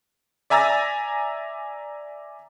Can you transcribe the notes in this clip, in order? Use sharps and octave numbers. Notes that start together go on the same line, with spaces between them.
D5 E5 G#5 A#5 E6 A6